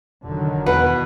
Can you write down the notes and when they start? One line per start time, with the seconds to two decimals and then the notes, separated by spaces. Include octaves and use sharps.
0.24 F1 D3 D#3 F#3
0.66 E2 B2 B4 F#5